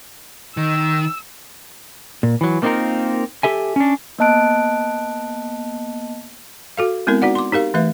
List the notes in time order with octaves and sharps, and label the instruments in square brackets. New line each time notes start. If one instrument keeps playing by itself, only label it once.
[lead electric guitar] D#3 [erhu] E6
[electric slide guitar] A#2
E3 F#3
A3 A#3 C4 D#4 F4 A#4
G4 A4 E5 G#5
C#4 D4
[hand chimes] A#3 B3 D#5 A5 F#6 D7
[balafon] F#4 A4 F5
G#3 B3 C4 E4 A#4
D#4 F#4 D5 F#5
C6 D6
D#4 G4 A#4 F5
E3 A3 B4 E5